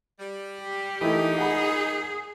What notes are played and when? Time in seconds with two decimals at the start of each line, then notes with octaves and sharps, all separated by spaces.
0.20 G3
0.62 G4
1.01 A#2 E3 G#3 A3 D#4 E4
1.38 G#4 F#5 G#5 B5